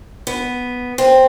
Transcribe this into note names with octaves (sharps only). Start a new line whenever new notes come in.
B3
C4